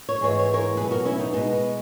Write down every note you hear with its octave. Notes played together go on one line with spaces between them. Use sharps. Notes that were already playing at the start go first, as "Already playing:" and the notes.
C#5
G#2 E3 G#3 C#5
C#5
A#4 C#5
E2 B2 F#3 G#4 B4
F#4 A#4
C#4 E4
B3 D#4
B2 G#3 B3 D#4
B3